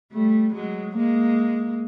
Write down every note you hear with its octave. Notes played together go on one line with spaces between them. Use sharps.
G3 A3
F#3 G#3
G#3 A#3